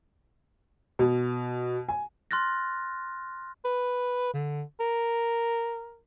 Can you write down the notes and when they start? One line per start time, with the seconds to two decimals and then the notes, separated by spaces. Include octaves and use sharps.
0.99 B2
1.89 G#5
2.31 C6 F6 F#6 A6 A#6
3.65 B4
4.33 D3
4.80 A#4